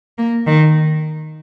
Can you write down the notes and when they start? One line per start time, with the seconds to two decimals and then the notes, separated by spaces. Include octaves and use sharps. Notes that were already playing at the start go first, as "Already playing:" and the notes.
0.18 A#3
0.47 D#3